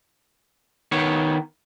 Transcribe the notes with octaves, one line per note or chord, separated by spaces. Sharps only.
D#3 B3 C#5